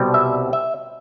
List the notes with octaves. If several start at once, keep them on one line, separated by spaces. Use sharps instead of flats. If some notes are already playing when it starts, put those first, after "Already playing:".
Already playing: C2 B2 G3 C4
E5
E5